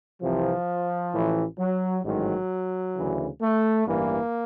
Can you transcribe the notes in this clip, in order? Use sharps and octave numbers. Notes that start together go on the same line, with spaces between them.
C2 C3 E3 F3
A1 A2 E3
F#3
A1 G#2 D#3 F#3
D2 C#3 E3
A3
A1 G2 E3 A#3